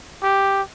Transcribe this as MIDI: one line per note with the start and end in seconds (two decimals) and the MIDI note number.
0.23 0.62 67